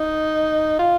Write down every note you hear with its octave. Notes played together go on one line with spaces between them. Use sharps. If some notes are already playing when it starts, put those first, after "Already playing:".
Already playing: D#4
F4